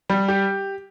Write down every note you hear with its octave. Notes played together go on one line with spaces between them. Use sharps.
G3
G4